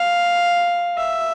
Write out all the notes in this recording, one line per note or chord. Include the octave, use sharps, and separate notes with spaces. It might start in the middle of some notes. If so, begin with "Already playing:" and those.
Already playing: F5
E5